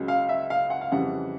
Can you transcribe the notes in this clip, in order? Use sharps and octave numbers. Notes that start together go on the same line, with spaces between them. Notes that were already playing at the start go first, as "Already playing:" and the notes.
Already playing: C#2 C#3 F#3
F5
E5
F5
F#5
F5
F2 C#3 E3 G3 F#5